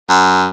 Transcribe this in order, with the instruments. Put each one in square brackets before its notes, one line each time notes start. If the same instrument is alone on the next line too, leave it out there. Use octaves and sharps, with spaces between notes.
[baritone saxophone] F#2